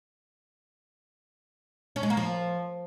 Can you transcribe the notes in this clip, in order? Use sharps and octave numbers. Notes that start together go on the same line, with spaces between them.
C#4
G#3
A#3
F3